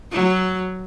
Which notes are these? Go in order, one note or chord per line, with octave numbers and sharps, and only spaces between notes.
F#3